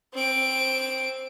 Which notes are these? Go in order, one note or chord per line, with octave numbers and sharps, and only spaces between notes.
C4 D7